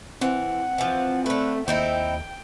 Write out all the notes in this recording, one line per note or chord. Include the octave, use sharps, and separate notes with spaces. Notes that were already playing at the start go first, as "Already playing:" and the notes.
E3 C4 F#5
E3 F3
D3 A3 B4
D#2 C4 D#4 E4 G5